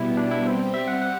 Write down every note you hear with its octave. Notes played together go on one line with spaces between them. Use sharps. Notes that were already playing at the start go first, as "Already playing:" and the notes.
Already playing: B2 G3 B3 E4
D4
E4
G3 C4 G4 C5
E5
F#5
F#5